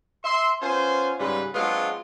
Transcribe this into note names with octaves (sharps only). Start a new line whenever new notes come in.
E5 C6
B3 C#4 F4 C5 G#5
G#2 C#3 G3 G#3 B4
F#3 G#3 B3 C4 D4 F4